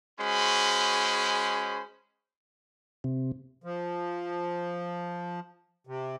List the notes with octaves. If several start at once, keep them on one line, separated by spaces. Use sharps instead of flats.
G#3 C#4 F#4 C5 B5
C3
F3
C3